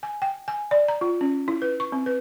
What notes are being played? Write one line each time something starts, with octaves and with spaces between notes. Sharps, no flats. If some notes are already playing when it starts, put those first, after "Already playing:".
G#5
G5
G#5
D5
A#5
F4
C#4
E4
B4
C#6
C4
B4